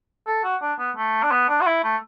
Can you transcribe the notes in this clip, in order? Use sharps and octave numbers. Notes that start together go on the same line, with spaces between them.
A4
F#4
D4
B3
A3
D4
B3
D4
F#4
E4
A3